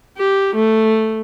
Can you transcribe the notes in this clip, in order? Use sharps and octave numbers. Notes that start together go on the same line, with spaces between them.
G4
A3